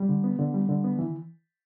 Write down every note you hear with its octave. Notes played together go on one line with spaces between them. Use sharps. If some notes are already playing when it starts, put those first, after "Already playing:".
Already playing: G3
D3
B3
D3
G3
D3
B3
E3